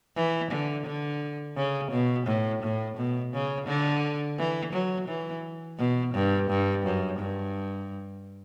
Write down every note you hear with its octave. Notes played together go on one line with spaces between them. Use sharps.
E3
D3
D3
C#3
B2
A2
A2
B2
C#3
D3
E3
F#3
E3
B2
G2
G2
F#2
G2